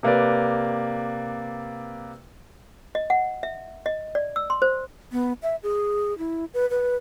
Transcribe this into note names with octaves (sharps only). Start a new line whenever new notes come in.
C3 A#3 B4 D5
D#5
F#5
E5
D#5
D5
E6
C6
C5
B3
E5
G#4
E4
B4
B4